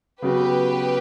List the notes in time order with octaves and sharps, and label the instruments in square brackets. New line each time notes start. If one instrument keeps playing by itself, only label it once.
[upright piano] C#3 F#3 B3 F#4 [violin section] G4 B4